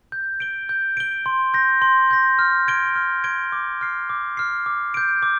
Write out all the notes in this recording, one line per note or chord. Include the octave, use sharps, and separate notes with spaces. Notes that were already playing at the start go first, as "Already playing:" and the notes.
G6
D7 G7
G6
D7 G7
C6
G6 A#6
C6
G6 A#6
F6
G#6 D7 G7
F6
G#6 D7 G7
D6
F6 C7
D6
F6 C7
D6
G6 D7
D6